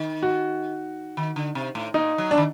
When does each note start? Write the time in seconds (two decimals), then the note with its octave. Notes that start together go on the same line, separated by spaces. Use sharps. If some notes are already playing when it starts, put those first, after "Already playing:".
Already playing: D#3
0.23 F#4
1.17 D#3
1.36 D3
1.55 C3
1.75 A2
1.94 A#2 D#4
2.18 F#3
2.31 D4
2.38 D#3